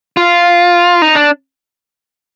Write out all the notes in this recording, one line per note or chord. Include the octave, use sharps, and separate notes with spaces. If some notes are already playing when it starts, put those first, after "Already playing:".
F4
D#4
D4